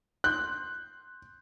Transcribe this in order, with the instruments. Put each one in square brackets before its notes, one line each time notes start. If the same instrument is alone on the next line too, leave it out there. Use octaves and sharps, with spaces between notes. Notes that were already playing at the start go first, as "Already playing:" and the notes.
[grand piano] C6 G6 [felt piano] F#6